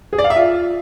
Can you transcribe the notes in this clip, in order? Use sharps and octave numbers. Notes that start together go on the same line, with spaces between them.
G#4
D5
F5
E5
F4